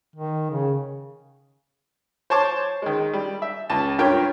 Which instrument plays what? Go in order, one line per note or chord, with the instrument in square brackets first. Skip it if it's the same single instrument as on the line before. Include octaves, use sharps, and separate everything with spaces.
[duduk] D#3
C#3
[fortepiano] C5 C#5 A5 C#6 D6
D#3 G#3
G3
E5
C#2 A5
G2 F4 G4 A#4 C#5 G5